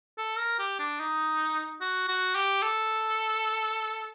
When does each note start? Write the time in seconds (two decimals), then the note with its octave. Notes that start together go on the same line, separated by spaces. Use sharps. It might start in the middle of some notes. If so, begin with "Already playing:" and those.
0.18 A4
0.38 A#4
0.59 G4
0.79 D4
1.00 D#4
1.81 F#4
2.08 F#4
2.35 G4
2.62 A4